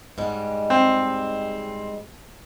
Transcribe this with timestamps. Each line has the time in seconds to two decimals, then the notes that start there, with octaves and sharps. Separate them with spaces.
0.18 G#2 G3 G#3
0.70 C4